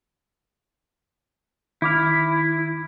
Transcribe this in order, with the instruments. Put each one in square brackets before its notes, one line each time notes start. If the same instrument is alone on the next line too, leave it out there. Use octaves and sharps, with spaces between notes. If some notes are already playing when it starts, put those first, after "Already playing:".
[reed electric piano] D#3 D6 F6 [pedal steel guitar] E4